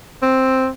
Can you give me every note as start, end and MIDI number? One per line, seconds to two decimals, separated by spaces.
0.22 0.68 60